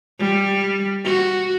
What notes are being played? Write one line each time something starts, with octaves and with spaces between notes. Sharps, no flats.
G3
F#4